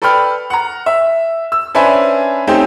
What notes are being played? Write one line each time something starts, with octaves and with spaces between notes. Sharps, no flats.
A4 B4 D5 G5 B5 F6
F#5 A#5
E5
E6
C#4 D4 B4 C5 E5 G#5
A3 C4 C#4 D#4 G4 G5